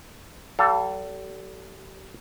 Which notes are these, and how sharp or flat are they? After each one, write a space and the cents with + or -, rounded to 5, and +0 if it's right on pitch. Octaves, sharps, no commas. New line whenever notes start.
G3 -40 A4 +10 F5 +0